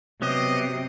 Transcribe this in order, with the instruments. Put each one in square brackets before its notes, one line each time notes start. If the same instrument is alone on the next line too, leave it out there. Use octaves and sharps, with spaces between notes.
[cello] C3 [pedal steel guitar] F#3 B3 G4 [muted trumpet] D#5 [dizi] D#6